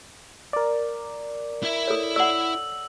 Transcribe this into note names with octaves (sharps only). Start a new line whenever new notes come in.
A#4 D5
E4 E5
A4 C#5
D5 F#5 E6 F#7